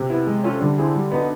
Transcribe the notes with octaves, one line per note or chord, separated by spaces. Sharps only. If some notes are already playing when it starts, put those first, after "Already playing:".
Already playing: C3
B3 E4
G#3
C#4 F4 A4
D3 G3
C4 E4 G#4
G3
B3 D#4 F#4